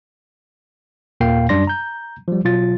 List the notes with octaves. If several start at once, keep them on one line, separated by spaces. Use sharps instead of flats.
D#2 A#2 A#3 F5 G5 C7
F#2 G3 D4 D5 C6 A#6
A#5 G6
F3 G3
B2 F#3 F4 A6